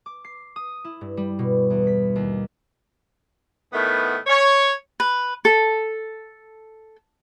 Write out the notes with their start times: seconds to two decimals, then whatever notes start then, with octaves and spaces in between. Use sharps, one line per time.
0.06 D6
0.25 C7
0.56 D#6
0.84 E4
1.01 G2
1.17 G3
1.39 B2
1.70 E2
1.87 B6
2.16 D#2
3.73 A2 D#3 A3 B3
4.27 C#5
5.00 B4
5.45 A4